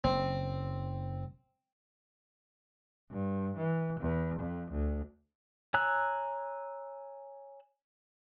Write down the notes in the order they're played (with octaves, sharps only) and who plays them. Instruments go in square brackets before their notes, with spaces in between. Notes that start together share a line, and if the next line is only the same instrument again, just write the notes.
[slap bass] F#1 [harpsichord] C4
[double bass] G2
E3
E2
F2
D2
[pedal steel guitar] C#5 G#5 A#5 E6 F#6